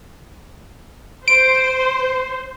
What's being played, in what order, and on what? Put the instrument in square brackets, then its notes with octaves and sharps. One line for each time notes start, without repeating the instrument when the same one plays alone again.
[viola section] C5 [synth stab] D7